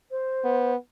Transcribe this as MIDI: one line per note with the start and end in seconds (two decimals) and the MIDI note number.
0.11 0.71 72
0.44 0.76 59